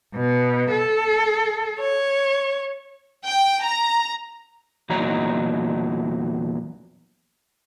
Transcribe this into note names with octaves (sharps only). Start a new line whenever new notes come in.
B2
A4
C#5
G5
A#5
E2 A#2 F#3 D#4 A#5